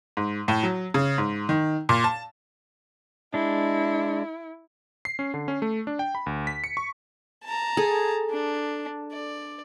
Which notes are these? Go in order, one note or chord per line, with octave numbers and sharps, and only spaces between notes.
G#2
A2
F#3
C#3
G#2
D#3
A#2
A5
G#3 D4 E4
C7
C#4
D3
C#4
A3
D4
G5
B5
D2
B6
C#7
C#6
A5 A#5
G#4 A4
D4
D5